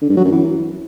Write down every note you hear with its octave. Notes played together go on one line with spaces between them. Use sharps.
D3
G2
F#3
F#2
E3